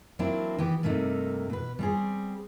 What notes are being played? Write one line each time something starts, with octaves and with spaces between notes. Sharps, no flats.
F#3 A#3 C4 D4 E4
E3 B3 G4
G2 C3 A3 A#3 D#4
B2 B4
G3 C4 G#4